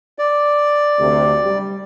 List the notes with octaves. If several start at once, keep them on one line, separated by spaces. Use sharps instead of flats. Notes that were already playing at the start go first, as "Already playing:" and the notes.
D5
D2 C3
G3